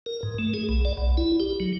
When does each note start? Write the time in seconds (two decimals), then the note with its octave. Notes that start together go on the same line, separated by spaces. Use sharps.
0.06 A#4
0.23 G#2
0.39 A3
0.54 G#4
0.69 B1
0.85 D5
0.97 B1
1.17 E4
1.40 G4
1.60 F#3